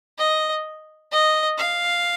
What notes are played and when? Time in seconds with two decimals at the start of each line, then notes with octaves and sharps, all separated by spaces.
0.19 D#5
1.12 D#5
1.58 F5